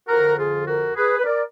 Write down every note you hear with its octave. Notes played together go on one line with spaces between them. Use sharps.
F2 D3 F3 F#4 A#4
F#4
F4 G#4
F#4 A#4
G#4 B4
B4
A#4 D5